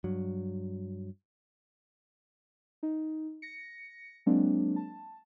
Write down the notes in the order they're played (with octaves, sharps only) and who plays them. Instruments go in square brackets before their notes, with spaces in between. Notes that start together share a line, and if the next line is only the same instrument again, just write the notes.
[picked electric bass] G2 F#3
[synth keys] D#4
A#6 C#7
F#3 G#3 A#3 C4 D4
A5